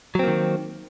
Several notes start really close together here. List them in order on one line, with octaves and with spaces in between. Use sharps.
F#3 C4 A#3 D#3